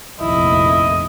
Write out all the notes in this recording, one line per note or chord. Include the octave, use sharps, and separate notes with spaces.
F1 A#1 D#2 E4 D#5